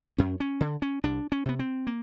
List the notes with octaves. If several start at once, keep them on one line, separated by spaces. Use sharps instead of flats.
F#2 C#4
C#4
D3
C#4
C2 D4
C#4
C3 B3
C4
A#3